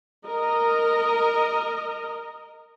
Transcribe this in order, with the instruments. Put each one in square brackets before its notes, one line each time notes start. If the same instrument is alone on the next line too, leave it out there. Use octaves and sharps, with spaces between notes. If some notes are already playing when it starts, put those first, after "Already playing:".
[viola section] A#4 D#5